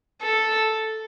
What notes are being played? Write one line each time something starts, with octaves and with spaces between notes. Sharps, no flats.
A4